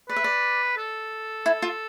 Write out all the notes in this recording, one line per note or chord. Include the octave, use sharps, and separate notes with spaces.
B4 D5
E5
D5
A4
E4
F4